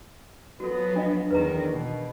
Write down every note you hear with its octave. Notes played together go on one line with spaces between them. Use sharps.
F3 F#3 B3 F#4 A4
D4 D#5
E2 D#3 B4 A#5
B2